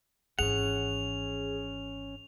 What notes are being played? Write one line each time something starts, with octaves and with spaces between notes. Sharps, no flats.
G#1 E3 C#4 G#4 F#5 F7